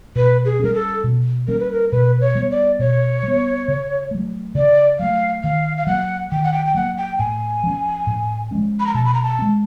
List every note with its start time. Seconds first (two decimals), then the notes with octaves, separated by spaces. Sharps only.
0.16 B2 B4
0.45 G#4
0.59 G3 A#3 C#4 A#4
0.74 A4
1.04 B2
1.48 G3 A#3 C#4 A#4
1.59 B4
1.71 A#4
1.91 B2 B4
2.21 C#5
2.35 G3 B3
2.51 D5
2.79 B2 C#5
3.23 G3 B3
3.68 C#3
4.11 F#3 A3
4.55 C#3 D5
4.99 F#3 A3 F5
5.43 D#3 F5
5.77 F5
5.87 F#3 A#3 F#5
6.32 D#3 G5
6.44 F#5
6.53 G5
6.66 G5
6.74 F#3 A#3 F#5
6.97 G5
7.19 A2 G#5
7.64 F3 G#3 C#4
8.07 A2
8.51 F3 G#3 C#4
8.80 B5
8.87 A#5
8.94 B2 A5
9.05 B5
9.14 A#5
9.23 A5
9.39 G#3 C4